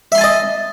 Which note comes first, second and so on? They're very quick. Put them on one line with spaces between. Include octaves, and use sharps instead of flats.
E5 C6 G#5 A5 D#5